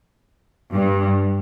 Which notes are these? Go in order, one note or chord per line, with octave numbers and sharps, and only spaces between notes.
G2